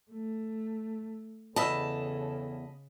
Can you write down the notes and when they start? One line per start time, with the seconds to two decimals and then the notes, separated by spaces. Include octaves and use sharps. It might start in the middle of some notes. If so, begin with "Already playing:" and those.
0.11 A3
1.56 E2 C#3 A4 D#5 A5 B5 E6